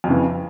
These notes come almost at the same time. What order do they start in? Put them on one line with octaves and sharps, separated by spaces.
F2 C#3 E3